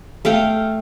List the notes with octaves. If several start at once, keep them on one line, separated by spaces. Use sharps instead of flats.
A3 F5 G5